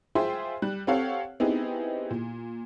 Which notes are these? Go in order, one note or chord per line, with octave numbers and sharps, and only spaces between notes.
F4 G#4 C5 E5 G5 C6
G3 F#6
C4 G4 A4 C#5 F5 F#5
B3 C4 D#4 E4 G4 G#4
A#2